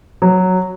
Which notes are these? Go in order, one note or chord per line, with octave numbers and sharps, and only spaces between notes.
F#3